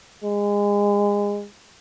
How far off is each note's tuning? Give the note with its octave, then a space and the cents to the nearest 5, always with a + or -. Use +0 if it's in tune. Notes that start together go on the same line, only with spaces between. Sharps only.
G#3 -25